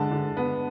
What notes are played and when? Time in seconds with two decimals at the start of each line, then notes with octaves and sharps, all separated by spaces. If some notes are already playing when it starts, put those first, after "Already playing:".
Already playing: D3 G#3 A5
0.11 D3
0.37 B3